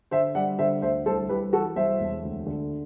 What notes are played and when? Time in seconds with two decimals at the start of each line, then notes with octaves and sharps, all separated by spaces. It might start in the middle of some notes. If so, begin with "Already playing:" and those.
0.11 D3 C5 E5
0.35 G3 D5 F#5
0.59 D3 C5 E5
0.82 D2 C5 E5
1.06 C2 A4 C5
1.29 C2 G4 B4
1.52 E3 F#4 A4
1.76 C2 C5 E5
2.00 E1
2.23 D2
2.46 D3